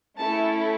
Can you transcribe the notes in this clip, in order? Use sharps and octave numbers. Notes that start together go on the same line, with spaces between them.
A3 C#4 E4 A4 A5